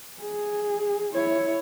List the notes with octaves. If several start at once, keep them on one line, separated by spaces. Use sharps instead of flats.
G#4
E4 C#5